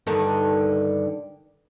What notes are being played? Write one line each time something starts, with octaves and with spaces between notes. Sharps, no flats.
G2 D3 D#3